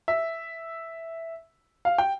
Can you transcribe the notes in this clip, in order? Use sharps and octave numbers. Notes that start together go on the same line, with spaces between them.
E5
F5
G5